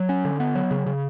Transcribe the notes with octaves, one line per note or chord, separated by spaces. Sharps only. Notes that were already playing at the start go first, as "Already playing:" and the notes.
Already playing: F#3
C#4
D3
B3
F#3
C#3
C#3